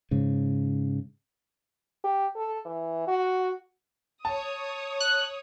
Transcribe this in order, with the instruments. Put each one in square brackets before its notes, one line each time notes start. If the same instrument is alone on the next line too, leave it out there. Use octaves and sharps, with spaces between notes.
[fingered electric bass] G#2 C#3
[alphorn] G4
A4
E3
F#4
[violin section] C#5 D#6 [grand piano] A5
[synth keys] F#6